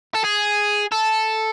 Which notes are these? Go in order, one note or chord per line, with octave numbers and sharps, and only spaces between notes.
A4
G#4
A4